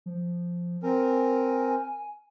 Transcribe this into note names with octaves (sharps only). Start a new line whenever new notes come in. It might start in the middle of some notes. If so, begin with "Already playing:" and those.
F3
C4 A#4 G#5